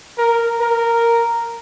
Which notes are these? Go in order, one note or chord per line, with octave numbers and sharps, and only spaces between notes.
A#4
A#4